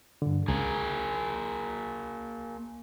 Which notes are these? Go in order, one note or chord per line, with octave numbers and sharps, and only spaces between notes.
G2 D3
C#2 A#3 G#4